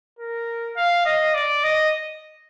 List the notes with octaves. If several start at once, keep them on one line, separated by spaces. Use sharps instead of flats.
A#4
F5
D#5
D5
D#5